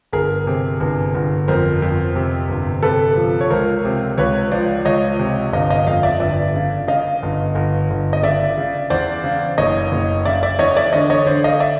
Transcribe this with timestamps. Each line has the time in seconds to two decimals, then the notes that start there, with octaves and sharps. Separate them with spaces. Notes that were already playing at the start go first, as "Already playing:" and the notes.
0.12 G1 G#4 A#4
0.47 C3
0.80 G1
1.14 G1
1.48 F2 A#4 C5
1.82 F2
2.16 C3
2.49 G1
2.83 C3 A4 B4
3.17 F3
3.41 C#5
3.50 C#2 A#4 C5
3.85 C3
4.18 C#2 B4 C#5
4.51 F3 C5 D5
4.85 C#2 C#5 D#5
5.19 C3
5.53 G1 D#5 F5
5.70 D#5 F5
5.87 F2 D#5 F5
6.03 D5 E5
6.20 G1 D5 E5
6.55 C#3
6.88 C#3 D#5 F5
7.22 G1
7.55 G1
7.90 G1
8.13 D#5
8.23 C#3 D5 E5
8.58 C#3
8.90 E2 C5 D5
9.24 C#3
9.58 F#1 C#5 D#5
9.92 F#1
10.25 C#3 D5 E5
10.43 D5 E5
10.59 E2 C#5 D#5
10.77 D5 E5
10.93 D3 C#5 D#5
11.10 C#5 D#5
11.26 D3 C5 D5
11.44 D#5 F5
11.60 D5 E5